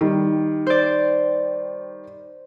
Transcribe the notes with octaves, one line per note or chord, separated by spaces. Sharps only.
D#3 G3
C5 D5